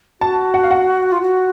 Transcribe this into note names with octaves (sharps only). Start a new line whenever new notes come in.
F#4 A5
F#5
F5
F#5
F4
F#4